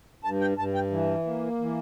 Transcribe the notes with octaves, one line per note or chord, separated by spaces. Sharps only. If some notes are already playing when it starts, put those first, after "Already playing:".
G2 A5
G5
G2 A5
G5
E3
A#3
E3